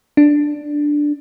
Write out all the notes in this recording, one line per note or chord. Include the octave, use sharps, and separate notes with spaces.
D4